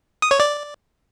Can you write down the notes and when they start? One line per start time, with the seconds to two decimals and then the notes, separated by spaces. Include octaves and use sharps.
0.22 D#6
0.31 C#5
0.40 D5